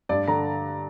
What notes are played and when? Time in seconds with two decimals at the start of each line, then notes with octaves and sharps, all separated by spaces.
0.09 G2 D5
0.27 D3 A#5